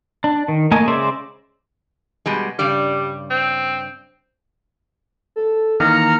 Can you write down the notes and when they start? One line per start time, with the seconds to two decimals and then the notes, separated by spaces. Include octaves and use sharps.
0.24 D4
0.48 D#3
0.71 A3 A#3 A#4 D#5 G#5
0.88 C#3 G#3 C5 D5 E5
2.26 B2 G3 G#3
2.59 G2 C#3 G3 D5
3.30 C4
5.36 A4
5.80 D#3 E3 A#3 A#5 F6 C#7